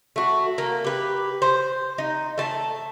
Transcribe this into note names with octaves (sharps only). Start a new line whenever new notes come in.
A3 F#4
A#3
G4 B4
C5
D#4
A3 A5